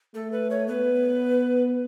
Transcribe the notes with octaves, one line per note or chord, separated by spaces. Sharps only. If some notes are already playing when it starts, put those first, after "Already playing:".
A3 A4
B4
C#5
B3 B4